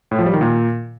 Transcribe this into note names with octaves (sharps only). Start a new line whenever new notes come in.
A2
F3
G3
D#3
A#2